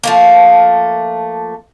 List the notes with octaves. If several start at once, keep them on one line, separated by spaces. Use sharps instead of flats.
F3 A3 A#3